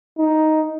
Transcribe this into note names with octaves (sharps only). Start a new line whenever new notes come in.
D#4